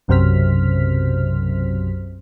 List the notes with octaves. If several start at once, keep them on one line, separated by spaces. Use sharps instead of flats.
B1 F#2 C3 C5 F6 B6